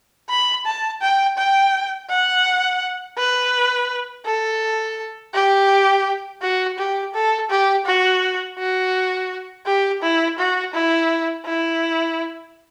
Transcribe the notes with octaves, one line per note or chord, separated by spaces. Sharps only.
B5
A5
G5
G5
F#5
B4
A4
G4
F#4
G4
A4
G4
F#4
F#4
G4
E4
F#4
E4
E4